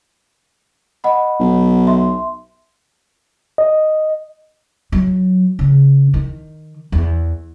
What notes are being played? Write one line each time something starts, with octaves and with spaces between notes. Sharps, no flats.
D#5 F#5 B5
B1
E5 C6
D#5
F#3
C#3
D#3
E2